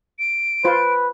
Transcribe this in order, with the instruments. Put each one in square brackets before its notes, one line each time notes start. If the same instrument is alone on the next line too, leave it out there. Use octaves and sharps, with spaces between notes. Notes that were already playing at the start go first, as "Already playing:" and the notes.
[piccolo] D7
[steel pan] F4 C5 [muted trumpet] B4